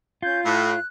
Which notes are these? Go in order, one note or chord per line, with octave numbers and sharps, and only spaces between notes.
C#4 F4 G6 G#6
A2 F#6